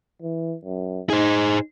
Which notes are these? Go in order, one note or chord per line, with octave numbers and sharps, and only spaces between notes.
E3
F#2
D#4 G#4 C5